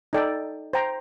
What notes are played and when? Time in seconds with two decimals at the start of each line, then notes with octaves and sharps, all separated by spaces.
0.13 D#4 A4 D5 G5
0.73 C5 G5 A#5